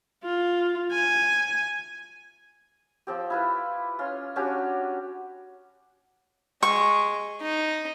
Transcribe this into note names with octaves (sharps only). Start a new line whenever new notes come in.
F4
G#5
F3 C4 G4
E4 F4 B4
C#4 F4 C6
C#4 D4 F#4 G4
G#3 C#6
D#4